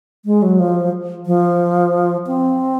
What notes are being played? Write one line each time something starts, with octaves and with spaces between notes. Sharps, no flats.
G#3
F#3
F3
F3
C4